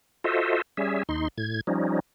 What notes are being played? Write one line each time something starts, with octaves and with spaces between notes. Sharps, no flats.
F4 F#4 A4 C5 D#5 E5
G3 C#4 G#4 E5
D#2 D#4 C6
A2 G#6
F3 G3 C#4 D#4